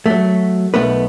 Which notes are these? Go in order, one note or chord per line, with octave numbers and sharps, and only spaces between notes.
F#3 A3
B1 A3 B3 B4